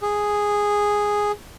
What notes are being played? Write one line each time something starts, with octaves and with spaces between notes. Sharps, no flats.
G#4